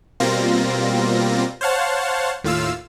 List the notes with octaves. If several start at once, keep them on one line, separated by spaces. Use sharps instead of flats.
B2 G3 A#3 C4 F4 A#6
C5 C#5 F5 F#5 A5
D#2 A2 F4 F5 E6